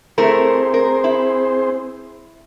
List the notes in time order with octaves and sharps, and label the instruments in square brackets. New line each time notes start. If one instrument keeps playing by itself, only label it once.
[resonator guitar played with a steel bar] A3 E4 A#4 [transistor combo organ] C4 G#4 C5
[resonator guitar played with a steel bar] A#4
E4